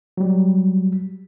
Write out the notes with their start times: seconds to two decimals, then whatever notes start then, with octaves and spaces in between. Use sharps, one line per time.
0.17 F#3 G3